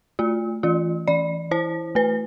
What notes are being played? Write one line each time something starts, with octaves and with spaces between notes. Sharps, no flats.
A3 F4
E3 F4
E3 D5
E4 C5
A3 B4